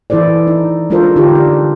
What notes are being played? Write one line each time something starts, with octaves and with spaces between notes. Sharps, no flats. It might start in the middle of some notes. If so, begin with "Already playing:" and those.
E3 E4 A4 C5 D5
D#4
G#3 D4 F4 A4 A#4 C5
D3 D#4 F4 G4
D4